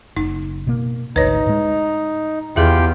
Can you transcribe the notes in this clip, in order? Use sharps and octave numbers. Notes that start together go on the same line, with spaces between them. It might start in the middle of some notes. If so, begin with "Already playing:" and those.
F#1 D#4
B2 A#3
G#1 D2 D#4 B4 C#5
A2 G#3
E2 F4 G4 G#4 E5 G5